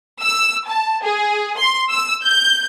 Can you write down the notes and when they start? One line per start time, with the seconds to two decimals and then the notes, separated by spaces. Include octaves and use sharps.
0.20 E6
0.68 A5
1.03 G#4
1.58 C6
1.90 E6
2.24 G6